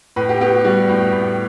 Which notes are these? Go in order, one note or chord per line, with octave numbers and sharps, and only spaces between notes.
A2 B4
G4
B3 G4
F#4
G3 F#4
A2
A2